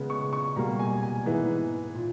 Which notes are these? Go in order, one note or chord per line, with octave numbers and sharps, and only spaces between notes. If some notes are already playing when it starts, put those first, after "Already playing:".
Already playing: C#3 G#3 B3
C#6
C#6
B2 G3 A#3 A#5
G#5
G#5
G#2 E3 G#3 B3
A#2